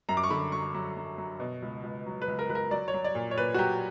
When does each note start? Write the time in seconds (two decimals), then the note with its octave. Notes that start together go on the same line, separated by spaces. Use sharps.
0.09 F#2 A#5
0.17 D6
0.24 C#6
0.30 D3 B5
0.52 F#3 C#6
0.74 F#3
0.97 F#3
1.18 F#3
1.40 B2
1.62 C#2
1.83 C#2
2.06 F#3
2.22 B4
2.28 C#2
2.39 A#4
2.49 C#2 B4
2.55 A#4
2.71 F#3 D5
2.88 C#5
2.94 F#3
3.04 D5
3.15 A#2
3.31 C#5
3.37 A#2 B4
3.54 F#4
3.58 F#3 G4